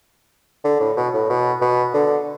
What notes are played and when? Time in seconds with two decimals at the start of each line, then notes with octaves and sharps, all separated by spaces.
0.64 D3
0.80 A2
0.97 B2
1.14 A2
1.30 B2
1.61 B2
1.94 D3